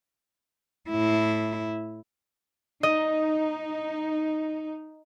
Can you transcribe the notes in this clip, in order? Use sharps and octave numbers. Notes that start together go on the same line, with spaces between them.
A2 E4
D#4 D#5